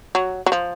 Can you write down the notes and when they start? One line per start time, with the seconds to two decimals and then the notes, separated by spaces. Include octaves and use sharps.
0.15 F#3
0.46 F#3
0.52 F3